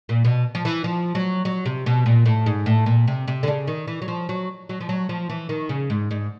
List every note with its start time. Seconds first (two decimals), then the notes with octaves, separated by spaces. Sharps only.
0.09 A#2
0.25 B2
0.55 F3
0.65 E3
0.84 F3
1.15 F#3
1.45 F#3
1.66 C3
1.86 B2
2.06 A#2
2.26 A2
2.46 G#2
2.66 A2
2.86 A#2
3.07 C3
3.27 C3
3.43 D3
3.48 C#3
3.67 D#3
3.87 E3
4.02 F#3
4.08 F3
4.29 F#3
4.69 F#3
4.81 F3
4.89 F#3
5.09 F3
5.30 E3
5.49 D#3
5.69 C#3
5.90 G#2
6.11 G#2